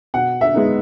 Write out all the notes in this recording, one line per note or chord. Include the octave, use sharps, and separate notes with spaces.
B2 F#5
E5
G#3 B3 D#4